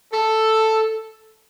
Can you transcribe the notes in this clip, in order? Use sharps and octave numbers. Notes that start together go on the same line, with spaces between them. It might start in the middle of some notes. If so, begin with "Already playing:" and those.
A4